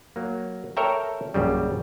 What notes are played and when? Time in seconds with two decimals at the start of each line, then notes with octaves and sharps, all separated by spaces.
0.16 F#3 A#3
0.77 A4 A#4 C#5 E5 G5 A#5
1.34 A#1 F#2 C#3 G3